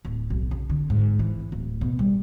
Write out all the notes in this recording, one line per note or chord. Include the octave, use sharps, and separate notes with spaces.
D1
B1
C#3
D3
G#2
E3
D1
B2
G3